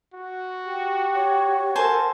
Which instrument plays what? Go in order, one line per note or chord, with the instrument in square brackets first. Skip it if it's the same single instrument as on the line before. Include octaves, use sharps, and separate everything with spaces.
[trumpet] F#4
[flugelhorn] G4
[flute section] C#5 C#6
[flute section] A4 A#4 F#5 [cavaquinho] C5 G#5 A5